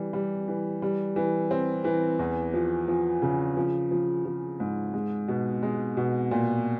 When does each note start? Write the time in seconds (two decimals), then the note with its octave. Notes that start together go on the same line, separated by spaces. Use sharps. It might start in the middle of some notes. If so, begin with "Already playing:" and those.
Already playing: E3 G3
0.13 G3
0.48 E3
0.82 G3
1.16 E3
1.51 C4
1.84 E3
2.19 E2
2.54 F3
2.88 F3
3.22 C#3
3.57 F3
3.91 F3
4.25 F3
4.60 G#2
4.94 G#3
5.28 B2
5.63 G#3
5.97 B2
6.31 A#2